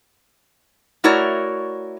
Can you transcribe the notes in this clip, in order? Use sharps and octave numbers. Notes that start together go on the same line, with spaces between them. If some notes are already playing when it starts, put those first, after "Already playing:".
A3 E4 F#4 A#4 C#5 D5